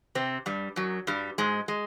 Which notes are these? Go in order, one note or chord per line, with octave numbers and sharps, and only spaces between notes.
C3 C4
G2 G3
F#2 F#3
G2 G3
G#2 G#3
G#3